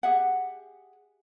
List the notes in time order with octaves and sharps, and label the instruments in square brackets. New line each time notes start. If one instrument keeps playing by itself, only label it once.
[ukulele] G4 G#4 E5 F#5